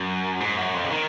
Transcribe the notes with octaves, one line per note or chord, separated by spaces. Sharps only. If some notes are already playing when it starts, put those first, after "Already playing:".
Already playing: F#2
G#2
F#2
F2
C#3
D#3